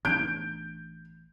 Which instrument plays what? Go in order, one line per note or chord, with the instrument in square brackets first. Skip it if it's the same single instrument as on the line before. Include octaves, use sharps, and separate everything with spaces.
[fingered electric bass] A1 B3 D4 [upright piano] G6 D7